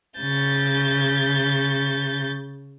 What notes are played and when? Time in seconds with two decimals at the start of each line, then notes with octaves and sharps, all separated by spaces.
0.18 C#3 G6 A6